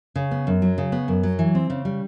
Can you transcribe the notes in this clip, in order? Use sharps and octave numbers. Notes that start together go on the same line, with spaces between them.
C#3
B3
F#2
F#3
C#3
B3
F#2
F#3
E3
C4
C#3
G3